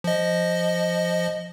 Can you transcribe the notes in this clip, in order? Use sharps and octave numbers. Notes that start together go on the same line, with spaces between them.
F3 D#5